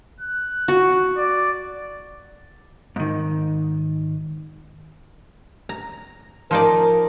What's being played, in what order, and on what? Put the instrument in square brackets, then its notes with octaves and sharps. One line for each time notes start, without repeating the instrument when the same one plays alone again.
[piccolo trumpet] F#6
[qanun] F#4
[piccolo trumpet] D5
[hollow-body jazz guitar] G#2 D#3
[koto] A#5
[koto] F3 D#4 D5 [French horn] A#4